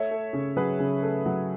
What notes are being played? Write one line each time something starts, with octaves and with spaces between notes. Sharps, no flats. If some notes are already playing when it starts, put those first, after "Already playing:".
Already playing: A3 C#5 E5
A3
C#3
F#3 G#4 B4
C#3
A3
F#3